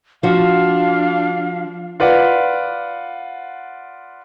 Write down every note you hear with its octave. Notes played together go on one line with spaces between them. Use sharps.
F3 D4 F#4 F5
F4 B4 D5 F#5